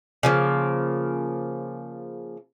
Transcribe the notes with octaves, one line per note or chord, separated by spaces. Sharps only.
C#3 F3 A#3